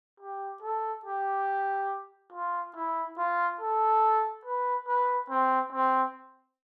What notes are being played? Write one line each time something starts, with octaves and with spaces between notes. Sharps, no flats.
G4
A4
G4
F4
E4
F4
A4
B4
B4
C4
C4